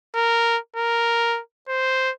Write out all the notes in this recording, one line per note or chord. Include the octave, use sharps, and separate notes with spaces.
A#4
A#4
C5